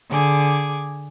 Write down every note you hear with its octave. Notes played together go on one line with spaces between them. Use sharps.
D3 G#4 D6